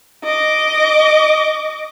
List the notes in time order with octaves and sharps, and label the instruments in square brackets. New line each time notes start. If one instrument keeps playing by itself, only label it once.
[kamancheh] D#5 D6